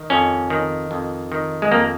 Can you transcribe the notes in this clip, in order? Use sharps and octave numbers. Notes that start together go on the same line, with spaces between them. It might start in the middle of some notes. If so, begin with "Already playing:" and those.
Already playing: D#3
F2 C#4
D#3
F2
D#3
G#3
F2 A#3